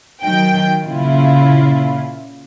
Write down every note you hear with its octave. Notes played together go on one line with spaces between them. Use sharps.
D#3 F#3 G5
A#2 C#3 E4 F4